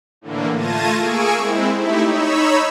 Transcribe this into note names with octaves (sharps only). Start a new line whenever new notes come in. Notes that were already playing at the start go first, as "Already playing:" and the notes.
A2 D3 E3 A#3
A3 F4 A5 G#6 A#6 D#7
A#3 G#4 G#5 C#6 E6 D7
G#3 C4 E4
A3 D#4 E4 G4 E5
D#4 C#5 B5 E6